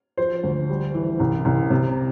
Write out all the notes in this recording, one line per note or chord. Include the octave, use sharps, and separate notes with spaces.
F3 C5
D2
G3
E3
C2
C2
C3